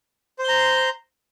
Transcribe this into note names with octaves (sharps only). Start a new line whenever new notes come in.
C5 A#5 C6